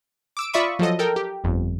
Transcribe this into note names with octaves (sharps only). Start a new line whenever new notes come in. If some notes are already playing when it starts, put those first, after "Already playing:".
D6 E6 D7
F4 D5 E5 B5 C#6 D#6
F3 F#3 A4 D#5
A4 A#4 G5
G4
G1 F2